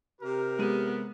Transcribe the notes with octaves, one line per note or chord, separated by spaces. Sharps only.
C3 G4 A#4
G#3 B3 D#7